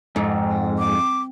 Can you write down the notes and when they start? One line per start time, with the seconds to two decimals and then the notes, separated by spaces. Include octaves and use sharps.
0.16 F2 G#2
0.78 D6